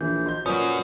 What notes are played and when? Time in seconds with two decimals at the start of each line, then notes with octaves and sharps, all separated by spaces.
0.01 A#1 E3 G6
0.26 F#4 D#5 C6 G6
0.46 A#2 C#4 F#4 B4 C5 D5 D#6